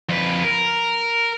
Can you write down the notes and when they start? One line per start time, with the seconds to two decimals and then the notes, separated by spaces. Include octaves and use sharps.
0.09 F2 B4
0.44 A#4